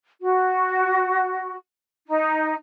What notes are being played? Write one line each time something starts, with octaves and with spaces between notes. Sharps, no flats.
F#4
D#4